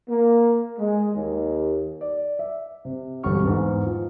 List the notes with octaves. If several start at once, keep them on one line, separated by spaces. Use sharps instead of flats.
A#3
G#3
D#2
D5
E5
C3
E1 G2 D3 G3 C#6 F6
E2 G#2
F3